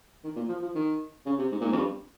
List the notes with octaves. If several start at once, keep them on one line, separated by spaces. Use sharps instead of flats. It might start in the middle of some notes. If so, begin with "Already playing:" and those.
D#3
A#2
F3
F3
D#3
C#3
C3
G#2
A#2
G#2
F2
G2